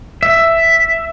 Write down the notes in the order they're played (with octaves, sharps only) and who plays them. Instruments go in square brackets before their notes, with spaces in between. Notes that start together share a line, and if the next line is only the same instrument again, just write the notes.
[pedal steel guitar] E5